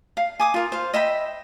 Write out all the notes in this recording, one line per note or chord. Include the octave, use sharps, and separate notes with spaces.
F5
G#5 D6 D#6
F4 A#4
C5 F5
D#5 E5 G5 B5